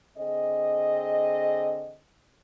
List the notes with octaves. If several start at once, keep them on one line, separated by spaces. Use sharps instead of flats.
D3 C4 G#4 D#5